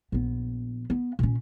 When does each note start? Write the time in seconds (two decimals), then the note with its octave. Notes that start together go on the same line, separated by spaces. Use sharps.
0.12 A#1 B3
0.90 B3
1.19 A#2 C#4